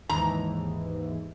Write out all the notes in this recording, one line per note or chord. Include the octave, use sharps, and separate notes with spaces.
D#2 G#2 E3 A#5